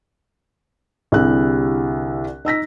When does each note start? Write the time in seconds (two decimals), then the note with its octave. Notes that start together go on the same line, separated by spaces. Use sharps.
1.12 C2 D3 E4 G4 G#4 F#6
2.45 D#4 E6 A#6 B6